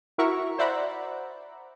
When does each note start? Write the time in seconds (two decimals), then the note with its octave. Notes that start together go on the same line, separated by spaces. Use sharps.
0.18 E4 F#4 A#4 E5 C#6
0.58 C5 D5 E5 F#5 A#5 B5